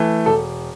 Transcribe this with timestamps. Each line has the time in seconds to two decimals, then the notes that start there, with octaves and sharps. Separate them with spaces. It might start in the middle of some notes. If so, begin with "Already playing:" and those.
Already playing: E3 A3
0.26 E1 A4